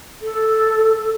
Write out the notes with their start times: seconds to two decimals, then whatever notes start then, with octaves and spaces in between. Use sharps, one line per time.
0.22 A4